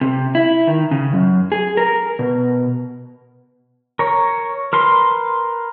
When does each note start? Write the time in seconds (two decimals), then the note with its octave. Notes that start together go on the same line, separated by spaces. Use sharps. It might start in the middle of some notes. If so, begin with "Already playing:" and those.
0.01 C3
0.35 E4
0.67 D#3
0.91 C#3
1.13 F#2
1.52 G#4
1.77 A#4
2.19 B2
3.99 A#4 C#5
4.73 A#4 B4 C6